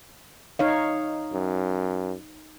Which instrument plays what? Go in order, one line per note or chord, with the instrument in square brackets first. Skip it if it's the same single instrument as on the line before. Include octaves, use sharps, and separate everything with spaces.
[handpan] D#4 C#5 F5
[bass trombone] F#2